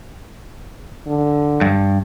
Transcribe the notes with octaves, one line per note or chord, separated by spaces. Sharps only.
D3
G2